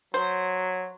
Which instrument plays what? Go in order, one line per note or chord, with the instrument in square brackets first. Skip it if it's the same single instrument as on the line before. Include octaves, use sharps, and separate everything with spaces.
[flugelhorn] F#3 [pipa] C5